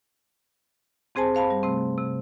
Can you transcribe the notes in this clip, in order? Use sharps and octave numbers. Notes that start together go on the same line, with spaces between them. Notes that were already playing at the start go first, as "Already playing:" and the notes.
G2 C4 G#4 C5 G#5 A5
C5 F5 A5 B5
G3
C3 A3 C4
C3